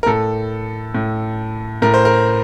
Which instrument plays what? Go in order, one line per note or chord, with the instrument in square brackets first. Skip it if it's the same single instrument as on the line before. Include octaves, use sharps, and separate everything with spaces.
[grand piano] A#4
A2 A4
A2
A2 A#4
C5
A#4